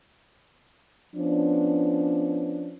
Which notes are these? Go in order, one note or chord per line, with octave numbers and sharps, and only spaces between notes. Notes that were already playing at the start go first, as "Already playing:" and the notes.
F3 B3 C#4 D4